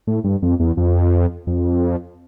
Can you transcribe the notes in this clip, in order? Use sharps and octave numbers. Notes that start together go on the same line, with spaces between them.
A2
G2
F2
E2
F2
F2